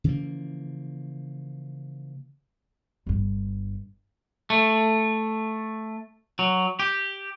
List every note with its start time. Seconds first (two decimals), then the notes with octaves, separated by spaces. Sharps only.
0.04 C#3 E3 F3 A#3
3.07 G1 G2
4.50 A3
6.39 F#3
6.79 G4